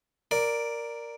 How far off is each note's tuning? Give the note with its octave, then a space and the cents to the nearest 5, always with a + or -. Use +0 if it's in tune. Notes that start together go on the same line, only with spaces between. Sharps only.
A#4 +0 D5 +0